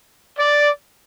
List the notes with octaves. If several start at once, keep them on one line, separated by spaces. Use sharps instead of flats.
D5